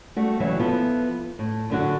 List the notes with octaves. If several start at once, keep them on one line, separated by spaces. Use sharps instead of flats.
G3 A3 F#4
C#3 E3 F#3 G3 E5
F3 B3 E4 F4 A4
A2
F#2 D3 F#4